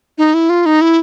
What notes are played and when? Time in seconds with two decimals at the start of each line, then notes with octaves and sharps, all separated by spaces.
0.18 D#4
0.34 E4
0.50 F4
0.66 D#4
0.81 E4